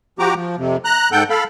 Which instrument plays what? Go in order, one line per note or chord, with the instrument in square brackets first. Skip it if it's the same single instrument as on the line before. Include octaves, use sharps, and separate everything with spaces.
[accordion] F3 F#4 G4 A#5 D6
F3
F2 C3
A#5 F#6
G#2 A4 F#5 G5 G6
A4 F5 B5